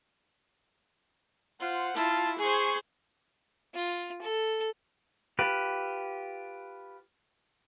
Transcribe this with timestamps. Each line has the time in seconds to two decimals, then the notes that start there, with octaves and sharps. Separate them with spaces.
1.60 F4 C5 F#5
1.95 E4 F4 A5
2.39 G#4 C5 G#5 C#6
3.75 F4
4.22 A4
5.39 F4 G4 B4